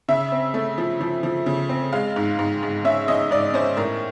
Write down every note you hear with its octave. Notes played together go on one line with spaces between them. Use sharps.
C#3 E5
C4
A3
F3
F3
F3
C#3
C4
G#3 F5
G#2
G#2
G#2
C#4 E5
C#4 D#5
G#2 D5
C#4 C5
A2 A#4